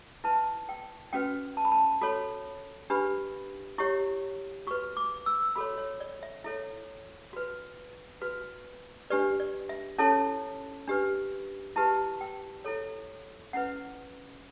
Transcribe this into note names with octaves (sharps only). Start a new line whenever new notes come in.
E4 B4 A5
G5
C#4 F#4 B4 G5
A5
B5
A5
F#4 A4 C#5 B5
D4 G4 B4 B5
E4 G4 C#5 C#6
F#4 B4 C#6
D6
E6
F#4 A4 C#5 B5
C#5
D5
E5
E4 A4 C#5 E5
F#4 B4
F#4 B4
D4 G4 B4 D5
D5
E5
C#4 E4 A4 C#5 A5
D4 G4 B4
E4 G4 B4 A5
G5
E4 A4 C#5
C#4 E4 B4 F#5